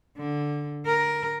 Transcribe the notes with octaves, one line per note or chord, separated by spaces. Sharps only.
D3
A#4